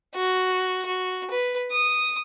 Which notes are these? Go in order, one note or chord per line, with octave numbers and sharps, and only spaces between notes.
F#4
F#4
B4
D#6